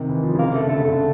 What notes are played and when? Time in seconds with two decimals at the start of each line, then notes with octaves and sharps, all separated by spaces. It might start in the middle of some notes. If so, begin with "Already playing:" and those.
Already playing: C3 D#3
0.09 E3
0.23 F3
0.34 C#3
0.39 C3 A#3
0.54 C#3 A3
0.66 D3 A3
0.77 C#3
0.85 D3 A3